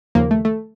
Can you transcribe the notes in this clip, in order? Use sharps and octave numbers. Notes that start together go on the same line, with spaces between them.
D#2 C#3 F3 A#3
A3
A3